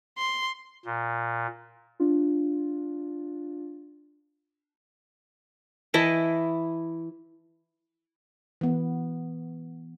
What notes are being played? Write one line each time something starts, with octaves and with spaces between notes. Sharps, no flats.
C6
A#2
D4 F4
E3 E4 D#5 A5
E3 B3